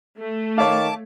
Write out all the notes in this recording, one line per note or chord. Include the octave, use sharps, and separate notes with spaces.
A3
D#3 C#5 F5 A5 D6